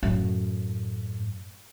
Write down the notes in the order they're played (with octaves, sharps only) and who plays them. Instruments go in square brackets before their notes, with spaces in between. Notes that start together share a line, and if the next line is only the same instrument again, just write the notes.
[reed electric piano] F#2 [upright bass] A2